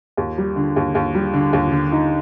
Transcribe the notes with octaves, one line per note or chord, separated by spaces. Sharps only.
D#2
G3
D3
D#2
D#2
G3
D3
D#2
D3
D#4